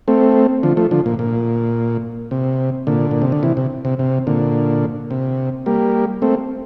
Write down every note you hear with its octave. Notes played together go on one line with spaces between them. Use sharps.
A3 C4
D3 F3
F3 A3
D3 F3
A#2
A#2
C3
A#2 D3
A#2
C3
D3
C3 E3
C3
C3
C3
A#2 D3
C3
G3 A#3
A3 C4